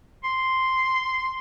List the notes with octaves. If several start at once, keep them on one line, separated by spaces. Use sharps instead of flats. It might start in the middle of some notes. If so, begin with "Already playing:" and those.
C6